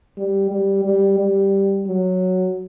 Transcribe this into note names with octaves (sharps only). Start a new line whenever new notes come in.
G3
G3
G3
G3
F#3